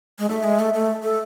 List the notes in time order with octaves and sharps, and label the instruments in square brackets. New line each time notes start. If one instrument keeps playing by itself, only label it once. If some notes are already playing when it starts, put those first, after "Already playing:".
[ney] G#3
[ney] A3 [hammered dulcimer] E5
[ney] G#3
A3
A3
A4